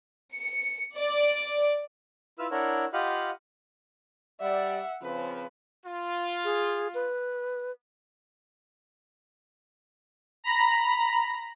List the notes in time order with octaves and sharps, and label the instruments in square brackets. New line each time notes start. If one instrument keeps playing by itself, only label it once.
[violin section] C#7
D5
[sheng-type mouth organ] E4 F4 B4 E6 F6
D4 E4 A#4 C#5 F#5
F4 G4 D#5 F5 F#5 B5
[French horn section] G3 D5 [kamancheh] E5 F#5
[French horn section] C#3 F3 C4 [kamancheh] B4
[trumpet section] F4
[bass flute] G#4
B4
[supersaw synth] A#5 B5 A#6